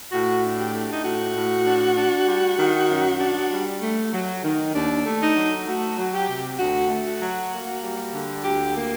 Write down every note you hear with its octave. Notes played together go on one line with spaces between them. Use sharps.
A2 F#4
D4
G4
A3
D#4
A2 F#4
A2
D4
D4
G3
D#3
F#2
D4
G3
A3
F#3
D#3
D#2 D4
A3
D#4
F#3
A3 F#4
F#3
G4
C3
D2 F#4
A3
F#4
F#3
A#3
G3
D3
D2 G4
A#3